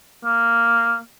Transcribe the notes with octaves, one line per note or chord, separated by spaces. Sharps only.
A#3